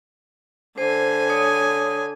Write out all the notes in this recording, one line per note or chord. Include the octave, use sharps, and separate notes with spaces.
D3 C5 G#5
C#5 D#6